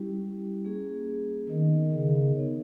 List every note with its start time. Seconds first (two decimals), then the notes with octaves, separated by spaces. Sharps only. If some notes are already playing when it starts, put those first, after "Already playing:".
Already playing: G3 C#4 E4 G4
0.65 A#3 C#4 G#4
1.49 D#3 B3 D#4 A#4 D#5
1.92 C#3
2.36 B3 D#4 G#4 C#5